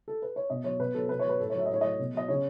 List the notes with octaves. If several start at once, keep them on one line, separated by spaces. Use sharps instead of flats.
A4
B4
C#5
B2 D#5
F#3 C#5
B2 B4
F#3 A4
B2 B4
C#5
F#3 B4
A2 A4
C#5
F#3 E5
D#5
A2 C#5
F#3 D#5
B2
F#3 D#5
C#3 C#5